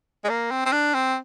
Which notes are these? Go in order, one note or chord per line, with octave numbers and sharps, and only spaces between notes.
G#3
A#3
C4
C4
D4
C4